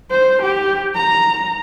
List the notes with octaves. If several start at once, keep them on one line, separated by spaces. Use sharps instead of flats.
C5
G4
A#5